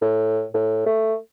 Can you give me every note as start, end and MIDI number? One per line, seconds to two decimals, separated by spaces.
0.02 0.45 45
0.54 0.83 45
0.86 1.15 57